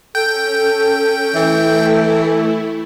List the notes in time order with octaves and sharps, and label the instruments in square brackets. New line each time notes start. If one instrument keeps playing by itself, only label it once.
[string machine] C#4 [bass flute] A4 [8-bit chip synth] G5
[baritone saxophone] E3 [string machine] A3 E4 [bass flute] A4